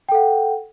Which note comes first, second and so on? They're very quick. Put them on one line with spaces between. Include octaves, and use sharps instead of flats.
G5 A4 F#5